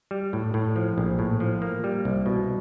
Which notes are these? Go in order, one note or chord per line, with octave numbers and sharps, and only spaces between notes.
G3
A2
A2
F3
A#1
A2
F3
A#3
G3
C2
B2